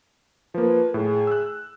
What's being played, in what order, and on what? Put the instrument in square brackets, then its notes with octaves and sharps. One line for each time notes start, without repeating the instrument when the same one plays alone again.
[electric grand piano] F3 A#3 [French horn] B4
[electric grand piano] A2 [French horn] G#4
[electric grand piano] E6 F#6